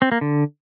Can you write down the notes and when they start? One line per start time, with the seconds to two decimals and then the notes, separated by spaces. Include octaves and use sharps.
0.02 C4
0.12 A#3
0.21 D3